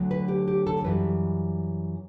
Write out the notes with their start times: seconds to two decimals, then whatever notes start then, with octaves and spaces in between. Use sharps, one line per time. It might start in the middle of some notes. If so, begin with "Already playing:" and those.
Already playing: D2 D3 F#3
0.11 B4
0.28 G4
0.48 G4
0.67 A4
0.84 F#2 E3 G3 B4